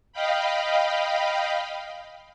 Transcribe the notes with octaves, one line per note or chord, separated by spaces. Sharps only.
D#5 F5 G5 B5